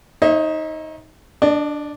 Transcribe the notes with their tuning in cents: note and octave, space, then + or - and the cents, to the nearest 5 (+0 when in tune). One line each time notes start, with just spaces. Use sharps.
D#4 +15 C#5 -40 E5 -10
D4 +0 D#5 -40